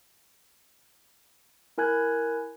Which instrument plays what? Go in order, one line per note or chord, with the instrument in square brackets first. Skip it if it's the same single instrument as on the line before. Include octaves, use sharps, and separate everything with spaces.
[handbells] E4 A#4 G#5 F#6 G#6